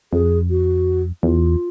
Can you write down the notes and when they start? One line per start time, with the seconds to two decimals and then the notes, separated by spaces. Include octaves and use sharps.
0.13 F2 G#4
0.50 F#4
1.23 E2 F4